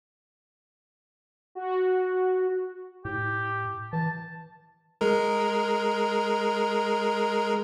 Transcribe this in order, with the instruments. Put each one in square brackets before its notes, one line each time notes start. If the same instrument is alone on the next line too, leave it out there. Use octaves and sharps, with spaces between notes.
[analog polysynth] F#4
[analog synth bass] A2 [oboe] G4
[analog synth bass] E3 [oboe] A5
[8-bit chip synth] G#3 A#4